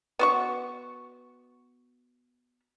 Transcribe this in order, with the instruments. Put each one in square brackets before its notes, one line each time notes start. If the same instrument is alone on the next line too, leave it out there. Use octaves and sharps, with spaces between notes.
[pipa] B3 F#4 C#6